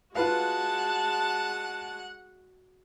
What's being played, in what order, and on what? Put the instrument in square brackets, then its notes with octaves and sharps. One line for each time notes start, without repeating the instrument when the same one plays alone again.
[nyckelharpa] G#3 F#4 [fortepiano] F4 B4 F5 [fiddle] F#5 [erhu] A5